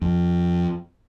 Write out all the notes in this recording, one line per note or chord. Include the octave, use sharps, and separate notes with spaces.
F2